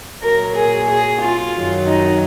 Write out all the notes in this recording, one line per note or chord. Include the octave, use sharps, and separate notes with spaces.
A#2 F#3 A#4
G#4
G#4
F4
F#2 D#3 F#3
D#4